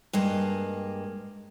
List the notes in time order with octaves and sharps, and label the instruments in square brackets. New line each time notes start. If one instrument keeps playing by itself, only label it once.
[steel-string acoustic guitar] G2 G#3 A#3